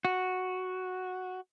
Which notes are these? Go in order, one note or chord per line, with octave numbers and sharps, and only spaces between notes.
F#4